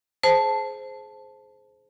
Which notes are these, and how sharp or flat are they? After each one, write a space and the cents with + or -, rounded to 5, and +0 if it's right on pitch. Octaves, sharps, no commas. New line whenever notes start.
G#4 +20 C5 +0 A5 +0